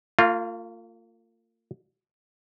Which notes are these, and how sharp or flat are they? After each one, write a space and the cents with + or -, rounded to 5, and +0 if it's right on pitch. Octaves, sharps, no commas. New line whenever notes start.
A#3 -45 F4 +0